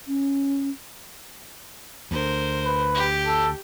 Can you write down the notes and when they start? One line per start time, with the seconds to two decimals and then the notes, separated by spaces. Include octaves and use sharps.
0.08 C#4
2.11 D2 A#4 C5
2.65 B4
2.95 G4
3.26 A4